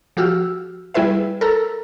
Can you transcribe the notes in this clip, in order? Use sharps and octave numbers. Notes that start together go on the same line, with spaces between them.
F3 F#4 G4 E6 F6
G3 E4 G#4 B4 E5
A4 A#4 A#5 E6